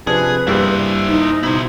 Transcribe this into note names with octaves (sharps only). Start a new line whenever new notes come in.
C3 F3 D4 G#4 B4
G2 G3 A#3 E4 C5
D#4
B2 E4 C5